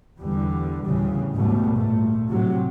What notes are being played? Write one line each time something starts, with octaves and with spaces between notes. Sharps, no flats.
E2 D3 G3
D2 A2 C#3 E3 G3
G#2 B2 D#3 G3 A3
A#2 A3
A2 C3 F#3